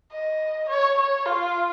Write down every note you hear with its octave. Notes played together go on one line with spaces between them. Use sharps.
D#5
C#5
C#5
F4